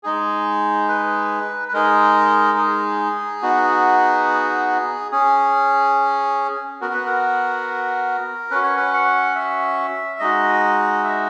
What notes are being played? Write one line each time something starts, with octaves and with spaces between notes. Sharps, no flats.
G#3 D#4 G#4
B4
B4
G#3 D#4 G#4 A#4
G#4
B3 D#4 F#4
C#4 G#4
B3 F#4 A#4
B4
A#4
C#4 F#4 B4
C#5
B4
F#5
E5
G#3 D#4 F#4 D#5
E5